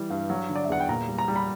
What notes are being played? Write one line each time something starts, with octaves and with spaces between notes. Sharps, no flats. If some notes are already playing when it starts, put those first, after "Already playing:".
Already playing: E3 G3
G2
F#3
D3
D5
E5
E2 F#5
G5
A#2 A#5
G3
A#5
G3
B5